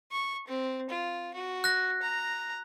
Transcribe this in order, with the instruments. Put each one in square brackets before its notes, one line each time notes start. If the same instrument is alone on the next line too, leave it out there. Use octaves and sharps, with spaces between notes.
[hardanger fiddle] C#6
C4
F4
F#4
[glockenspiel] F#6 A#6
[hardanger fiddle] A#5